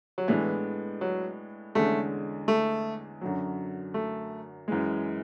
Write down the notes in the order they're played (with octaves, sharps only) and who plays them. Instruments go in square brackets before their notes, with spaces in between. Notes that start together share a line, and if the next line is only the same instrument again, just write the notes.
[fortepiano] F#3
[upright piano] A2 G#3 B3 D4 [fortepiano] E3
[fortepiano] F#3
[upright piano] E2 D3 G#3 C#4 [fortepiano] A3
[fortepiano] A3
[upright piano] F#2 D3 F#3
[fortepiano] A3
[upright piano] F#2 E3 G#3